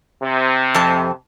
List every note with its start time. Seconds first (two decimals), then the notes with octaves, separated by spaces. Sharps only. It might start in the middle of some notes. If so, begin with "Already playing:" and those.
0.22 C3
0.74 F2 A5